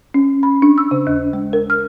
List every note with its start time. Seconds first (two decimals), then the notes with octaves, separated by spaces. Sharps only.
0.14 C#4
0.43 B5
0.62 D4
0.78 E6
0.91 C#3
1.07 D#2
1.33 G#3
1.53 A#4
1.70 F6